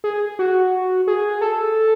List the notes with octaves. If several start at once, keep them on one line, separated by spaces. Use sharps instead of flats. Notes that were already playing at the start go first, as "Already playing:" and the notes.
G#4
F#4
G#4
A4